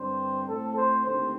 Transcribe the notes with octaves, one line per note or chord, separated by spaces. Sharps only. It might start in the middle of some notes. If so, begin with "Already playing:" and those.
Already playing: G2 D3 G3 C4 C5
A2 A3 C4 A4
C5
D#2 D3 A3 C4 C5